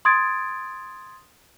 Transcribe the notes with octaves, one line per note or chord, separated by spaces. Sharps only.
C6 D#6 G#6 A6 D7